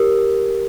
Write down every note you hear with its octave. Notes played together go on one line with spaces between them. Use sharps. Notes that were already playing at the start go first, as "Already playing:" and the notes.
Already playing: G4 A#4